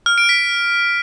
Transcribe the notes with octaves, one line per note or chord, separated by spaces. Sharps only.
F6
D7
B6